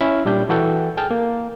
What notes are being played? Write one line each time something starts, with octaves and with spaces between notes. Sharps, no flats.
C#4 E4 E5 B5 F6
A#2 G3 D4 G6
E3 F#4 A4 G5 G6
G#4 G5 A5 F6
A#3